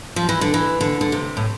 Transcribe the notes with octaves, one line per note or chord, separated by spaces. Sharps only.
F3
E3
D3
E3
D3
D3
C3
A2